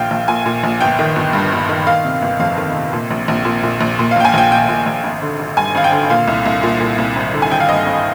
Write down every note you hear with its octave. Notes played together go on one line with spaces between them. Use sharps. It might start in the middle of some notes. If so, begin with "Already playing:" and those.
Already playing: A#1 A#2 F5 G5
A#1
A#2 G#5
A#2
A#1
G1 G5
D#3
G1
G2
G1
D#3
D#3 F5
C3
G1
F2 F5
D#3
C3
A#2
A#1
A#1
A#2
A#2
A#1
A#2
F5
A#1 G5
G#5
A#1 G5
A#2 G5
A#2
A#1
G#1
D3
G#1
G2 G#5
G#1 F5
G5
D3
A#2 F5
C2
C2
A#2
A#2
C2
G#1
D3
G#5
G#1 G5
F5
G2 D#5
G#1